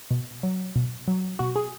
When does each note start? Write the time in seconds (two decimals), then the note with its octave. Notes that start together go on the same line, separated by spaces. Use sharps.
0.11 B2
0.43 F#3
0.76 B2
1.08 F#3
1.39 B2 F#4
1.56 G#4